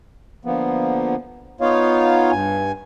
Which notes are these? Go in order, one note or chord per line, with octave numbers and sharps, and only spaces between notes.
D3 F3 A#3 B3
B3 D#4 F4 C#5 F5
G2 G#5